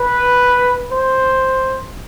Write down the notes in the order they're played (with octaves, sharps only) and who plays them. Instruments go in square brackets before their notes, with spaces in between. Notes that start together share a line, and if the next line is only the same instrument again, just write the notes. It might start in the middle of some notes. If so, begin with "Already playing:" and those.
Already playing: [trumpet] B4
C5